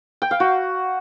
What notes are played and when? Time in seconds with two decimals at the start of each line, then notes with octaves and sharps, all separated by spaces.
0.22 G5
0.31 F5
0.40 F#4